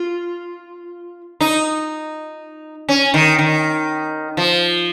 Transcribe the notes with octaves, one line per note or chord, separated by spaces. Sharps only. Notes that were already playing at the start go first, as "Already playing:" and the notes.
Already playing: F4
D#4
C#4
D#3
D#3
F3